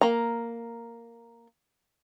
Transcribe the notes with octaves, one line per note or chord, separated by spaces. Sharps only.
A#3 A#5